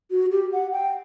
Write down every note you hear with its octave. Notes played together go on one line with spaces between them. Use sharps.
F#4
G4
F#5
G5